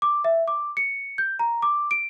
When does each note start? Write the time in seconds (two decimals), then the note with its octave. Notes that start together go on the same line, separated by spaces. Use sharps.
0.02 D6
0.24 E5
0.48 D6
0.77 C#7
1.18 G6
1.39 A#5
1.62 D6
1.91 D7